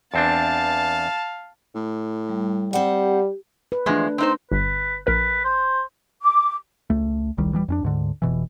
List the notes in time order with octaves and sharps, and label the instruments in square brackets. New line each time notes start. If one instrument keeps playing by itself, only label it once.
[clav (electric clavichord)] E2 C4 D4 [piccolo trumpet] F5 [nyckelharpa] A5
[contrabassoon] A2
[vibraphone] G3
[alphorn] G3 [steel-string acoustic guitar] C4 F#5 [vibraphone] G4
[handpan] B4
[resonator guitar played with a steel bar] E2 F3 G#3 [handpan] A3 D4
[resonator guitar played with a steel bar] C4 D#4 C5
[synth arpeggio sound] G1 [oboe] B4
[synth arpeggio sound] A#1 A#4 [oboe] B4
[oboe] C5
[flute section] D6
[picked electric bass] C#2 A3
E1 C2 D#3 G3
D#1 E3 F3 G3
F2 C#4 D4
D2 G#2 D3
F1 B2 E3